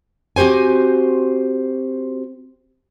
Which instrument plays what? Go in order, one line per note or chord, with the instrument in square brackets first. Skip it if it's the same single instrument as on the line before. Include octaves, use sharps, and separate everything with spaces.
[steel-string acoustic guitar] C4 F#4 G4 C5 G#5